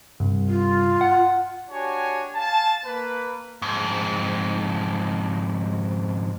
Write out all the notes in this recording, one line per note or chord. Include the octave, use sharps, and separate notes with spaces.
C2 G2
F4
F#5
D4 F#4 G4 C#5 G#5
F5 G#5 A5
A#3 B4
F2 G#2